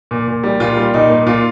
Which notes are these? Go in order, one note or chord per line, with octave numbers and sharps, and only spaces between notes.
A#2
A#2
G3
A#2 F4
G3
A#2 D#4
A#2
A#2 F4